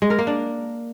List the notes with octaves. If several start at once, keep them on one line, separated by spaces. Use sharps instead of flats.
G#3
A#4
A#3
D4